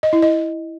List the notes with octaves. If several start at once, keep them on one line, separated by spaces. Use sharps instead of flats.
D#5
E4
D#5